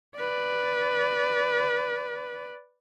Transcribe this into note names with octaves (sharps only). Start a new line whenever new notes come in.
B4 D5